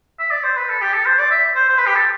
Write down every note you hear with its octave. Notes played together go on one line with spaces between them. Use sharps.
E5
D5
C5
B4
A4
G4
A4
C5
D5
E5
C5
C5
B4
G4
A4